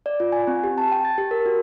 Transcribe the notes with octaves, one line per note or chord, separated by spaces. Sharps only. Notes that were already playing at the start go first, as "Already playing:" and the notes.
D5
F4
G#5
C4
G4
A5
G5
A6
G4
A#4
F#4